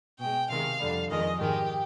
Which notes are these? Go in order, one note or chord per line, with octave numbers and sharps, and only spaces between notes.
B2 G#3 G5
C3 D#3 G#3 F5
F2 D3 G3
F2 D#3 G#3 D#5
G#2 D#3 G#3 G4